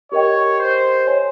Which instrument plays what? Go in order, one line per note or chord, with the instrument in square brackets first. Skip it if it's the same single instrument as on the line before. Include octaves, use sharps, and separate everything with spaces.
[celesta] G4 A#4 D#5 G5 [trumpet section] C#5
[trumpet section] C5
[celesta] C#5 G#5 C6